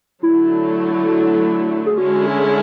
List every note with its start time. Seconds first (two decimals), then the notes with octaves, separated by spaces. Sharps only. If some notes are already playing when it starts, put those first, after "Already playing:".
0.23 D3 F#3 A3 E4
1.86 G#4
1.97 D3 G#3 C#4 E4 F#4
2.26 G#4